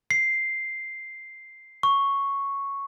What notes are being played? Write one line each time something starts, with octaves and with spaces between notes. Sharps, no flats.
C7
C#6